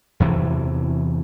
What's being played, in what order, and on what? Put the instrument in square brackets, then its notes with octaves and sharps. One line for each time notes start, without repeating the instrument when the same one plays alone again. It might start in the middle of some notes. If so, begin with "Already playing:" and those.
[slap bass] E2 C3 E3 F#3